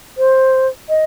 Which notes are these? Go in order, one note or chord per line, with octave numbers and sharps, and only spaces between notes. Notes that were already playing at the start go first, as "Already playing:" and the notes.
C5
D#5